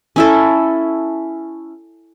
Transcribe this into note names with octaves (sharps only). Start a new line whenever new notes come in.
C#4 E4 A4